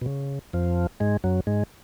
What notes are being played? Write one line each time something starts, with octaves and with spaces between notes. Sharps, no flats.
B2
C#3
F2 F3
G#2 G#3
F#2 F#3
G#2 G#3